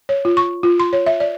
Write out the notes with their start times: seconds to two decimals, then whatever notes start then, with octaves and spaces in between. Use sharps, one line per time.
0.09 C#5
0.25 F4
0.37 C#6
0.63 F4
0.80 C6
0.93 C#5
1.06 E5
1.20 D5